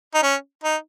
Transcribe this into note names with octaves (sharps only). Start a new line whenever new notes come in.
D#4
C#4
D#4